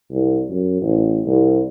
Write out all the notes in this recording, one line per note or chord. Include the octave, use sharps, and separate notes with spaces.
C2
F#2
A1
C2